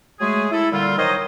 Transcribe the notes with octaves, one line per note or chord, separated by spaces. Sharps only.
F#3 G#3 A3 G#4
E4 A4
A#2 D3 G3 C4 F4
D#3 F#3 C5 C#5 D#5